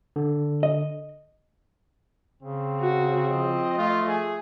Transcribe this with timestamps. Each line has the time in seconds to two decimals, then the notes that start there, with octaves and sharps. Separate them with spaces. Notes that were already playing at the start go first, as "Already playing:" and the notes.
0.16 D3
0.63 D#5
2.43 C#3 C4
2.80 F#4
3.31 F3 D#5
3.78 A3 F4
4.09 G#4